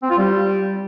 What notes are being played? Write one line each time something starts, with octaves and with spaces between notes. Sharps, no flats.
C4
F4
G3